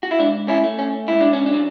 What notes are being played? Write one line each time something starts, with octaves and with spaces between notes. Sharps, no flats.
F#4
E4
G#2 D4
C#4 E4
A3
C#4
G#2 E4
D4
C#4
D4
F#3